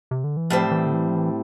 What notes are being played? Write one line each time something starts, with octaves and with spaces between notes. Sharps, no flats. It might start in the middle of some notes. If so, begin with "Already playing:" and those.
C3
D3
E3
A2 F3 G3 C4
E3
D3
E3
F3
E3